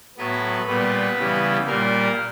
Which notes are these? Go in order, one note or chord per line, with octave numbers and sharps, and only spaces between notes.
A2 F#3 B3 B4
A#2 G3 B3 B4
C#3 E3 G3
A#2 G3 A#3 A#4